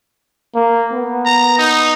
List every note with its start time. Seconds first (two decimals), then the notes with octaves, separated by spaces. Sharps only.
0.55 A#3
0.93 B3
1.26 A#5
1.59 D#4